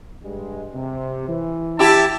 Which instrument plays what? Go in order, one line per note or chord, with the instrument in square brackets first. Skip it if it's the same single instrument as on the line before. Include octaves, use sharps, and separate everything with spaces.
[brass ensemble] G2 G3 G#3
C3
E3
[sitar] E4 G4 [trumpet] A5